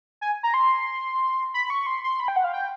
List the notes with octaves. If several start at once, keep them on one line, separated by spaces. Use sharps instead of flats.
G#5
A#5
C6
B5
C#6
C6
C6
B5
G5
F#5
F5
G5